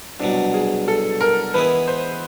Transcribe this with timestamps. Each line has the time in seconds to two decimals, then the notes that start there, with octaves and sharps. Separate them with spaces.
0.20 C2 B2 F#3 D4
0.54 G#4
0.88 A4
1.21 A#4
1.54 E3 G#3 B3 E4 G#4 B4
1.88 C5